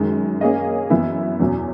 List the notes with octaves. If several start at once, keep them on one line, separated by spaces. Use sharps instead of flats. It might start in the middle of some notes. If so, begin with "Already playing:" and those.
Already playing: F#2 D#3 G#3
A#3 C#4 G#4 D#5
F#2 E3 B3 E4
E2 B2 F#3 C#4